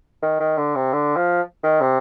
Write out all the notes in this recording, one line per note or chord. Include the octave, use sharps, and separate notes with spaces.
D#3
D#3
D3
C3
D3
F3
D#3
C3